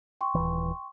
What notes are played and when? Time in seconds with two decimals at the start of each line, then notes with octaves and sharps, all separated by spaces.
0.21 G5 C6 C#6
0.35 D#1 A#1 E3